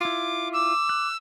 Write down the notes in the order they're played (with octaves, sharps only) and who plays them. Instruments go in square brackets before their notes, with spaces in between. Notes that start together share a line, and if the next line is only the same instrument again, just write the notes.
[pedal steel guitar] E4 F4 [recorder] D6
[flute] D6 [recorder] E6
[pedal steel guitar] F#6